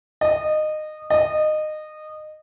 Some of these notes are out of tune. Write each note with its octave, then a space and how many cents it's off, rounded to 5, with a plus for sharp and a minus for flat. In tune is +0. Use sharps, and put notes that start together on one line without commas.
D#5 -20
D#5 -20